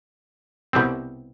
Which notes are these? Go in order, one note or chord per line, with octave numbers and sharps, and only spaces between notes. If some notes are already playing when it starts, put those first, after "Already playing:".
C2 B2 G3 C4